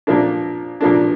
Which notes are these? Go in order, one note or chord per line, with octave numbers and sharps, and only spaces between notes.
A#2 F3 A#3 D4
A#2 F3 A#3 D4